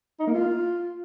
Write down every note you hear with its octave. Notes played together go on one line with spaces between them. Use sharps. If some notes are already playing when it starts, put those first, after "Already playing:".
D#4
A#3
F4